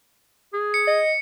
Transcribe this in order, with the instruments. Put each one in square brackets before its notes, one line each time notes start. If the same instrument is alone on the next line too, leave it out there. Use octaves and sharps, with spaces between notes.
[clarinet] G#4
[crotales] C#7
[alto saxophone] D#5